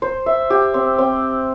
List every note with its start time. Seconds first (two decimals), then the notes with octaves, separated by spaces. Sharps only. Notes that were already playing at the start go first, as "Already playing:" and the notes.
0.02 C5
0.26 E5
0.50 G4
0.74 C4
0.98 C4